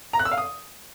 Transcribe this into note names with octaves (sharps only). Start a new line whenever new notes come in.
A#5
F#6
E6
F5
D#6